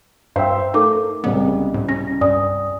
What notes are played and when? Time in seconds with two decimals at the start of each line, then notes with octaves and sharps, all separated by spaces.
0.36 G2 C5 E5 F5 G5 E6
0.74 A3 D#4 A#4 D6
1.24 C2 C#3 G#3 B3
1.74 A2
1.89 C#4 A#6
2.21 G2 D5 G#5 D#6